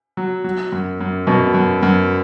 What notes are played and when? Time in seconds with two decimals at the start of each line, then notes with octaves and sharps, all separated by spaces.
0.17 F#3
0.44 F#3
0.72 F#2
1.00 F#2
1.27 F#2 B2
1.54 F#2
1.83 F#2